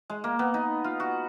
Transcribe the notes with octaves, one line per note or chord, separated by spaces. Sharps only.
G#3
A#3
B3
D#4
F4
F#4